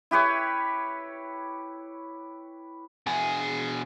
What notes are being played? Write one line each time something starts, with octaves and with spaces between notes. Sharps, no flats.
E4 G4 B4 C#5
B2 G#4